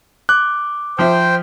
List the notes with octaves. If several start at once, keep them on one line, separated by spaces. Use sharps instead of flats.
D6 F#6
F3 C5 E5 G5